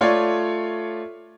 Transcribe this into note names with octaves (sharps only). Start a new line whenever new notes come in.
A3 F4 C#5 D5